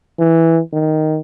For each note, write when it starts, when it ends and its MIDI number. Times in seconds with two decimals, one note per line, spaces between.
0.19 0.60 52
0.73 1.19 51